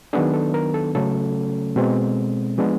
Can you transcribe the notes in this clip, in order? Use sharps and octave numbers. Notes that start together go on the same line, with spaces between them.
D#3 F#3 B3 D4 G#4
A4
A#4
A4
C#3 F#3 A3 C#4 A4
B2 G#3 C4
F3 G#3 B3 D4